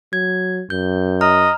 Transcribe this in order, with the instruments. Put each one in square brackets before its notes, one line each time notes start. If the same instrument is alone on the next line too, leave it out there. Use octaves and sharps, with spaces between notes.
[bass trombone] F#3 [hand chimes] G#6
[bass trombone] F#2 [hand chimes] G6
[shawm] D#5 [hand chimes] A#5 F6